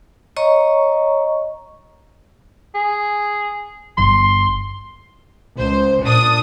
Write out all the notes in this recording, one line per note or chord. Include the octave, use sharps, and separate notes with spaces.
C#5 D#5 A#5 C#6
G#4
G1 C6
C#2 C5
A#2 D4 D#6